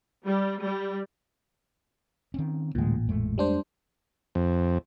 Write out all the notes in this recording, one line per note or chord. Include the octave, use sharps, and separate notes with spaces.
G3
G3
D#3 C4 C#4
A1 D2 A#2 G#3
F2 G#3 A3
G3 D4 C5
F2